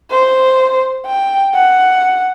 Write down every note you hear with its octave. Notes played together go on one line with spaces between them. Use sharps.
C5
G5
F#5